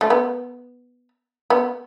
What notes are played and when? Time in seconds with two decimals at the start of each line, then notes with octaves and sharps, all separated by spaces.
0.01 A3
0.10 B3
1.50 B3